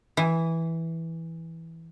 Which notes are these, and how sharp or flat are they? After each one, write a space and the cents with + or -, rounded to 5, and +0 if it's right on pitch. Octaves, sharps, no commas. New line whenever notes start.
E3 -5